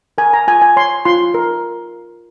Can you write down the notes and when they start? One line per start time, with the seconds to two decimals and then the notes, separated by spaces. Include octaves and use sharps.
0.18 A#4 G#5
0.33 A#5
0.47 F4 G#5
0.62 G#5
0.76 C#5 C6
1.05 F4 C6
1.34 A#4